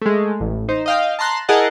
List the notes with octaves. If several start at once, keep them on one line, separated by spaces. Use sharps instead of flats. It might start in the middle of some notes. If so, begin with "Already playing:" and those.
G#3 A3
A1
D#4 C5
D#5 F5 G5
A5 A#5 C6 F#6
E4 G#4 A#4 D#5 F#5 A5